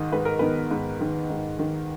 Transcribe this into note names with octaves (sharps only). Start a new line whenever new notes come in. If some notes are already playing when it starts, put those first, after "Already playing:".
Already playing: G#2 D#3 D#5
G#2 B4
A#4
D#3 B3 B4
G#2
D#3
G#2
D#3